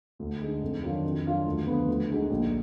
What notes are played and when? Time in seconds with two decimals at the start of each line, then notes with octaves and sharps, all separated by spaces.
0.19 D2
0.41 D3 G#3 D#4
0.62 F2
0.83 D#3 F#3 D4 F4
1.04 F2
1.25 D#3 F#3 D4 F4
1.46 D2
1.67 D3 F3 B3
1.88 D2
2.09 D3 G#3 D#4 F#4
2.30 A#1